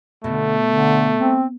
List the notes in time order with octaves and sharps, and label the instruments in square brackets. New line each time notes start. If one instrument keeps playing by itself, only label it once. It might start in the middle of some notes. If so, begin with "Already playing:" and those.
[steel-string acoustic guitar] B2 [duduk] D3 [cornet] A3
[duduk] D3
C4